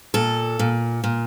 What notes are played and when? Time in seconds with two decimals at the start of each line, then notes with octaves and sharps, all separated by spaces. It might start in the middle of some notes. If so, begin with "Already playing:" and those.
0.14 A#2 A4
0.59 A#2
1.04 A#2